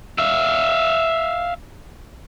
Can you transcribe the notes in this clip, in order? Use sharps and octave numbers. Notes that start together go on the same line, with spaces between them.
E5 F5